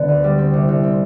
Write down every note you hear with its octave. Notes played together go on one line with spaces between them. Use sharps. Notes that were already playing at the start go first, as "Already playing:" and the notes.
Already playing: D3 B3
D2
G3
C4
C2
C2
C4